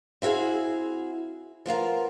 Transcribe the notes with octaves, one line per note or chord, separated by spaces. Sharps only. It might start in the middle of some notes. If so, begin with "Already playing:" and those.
C4 E4 F#4 G#4 F5
F3 B3 F4 A#4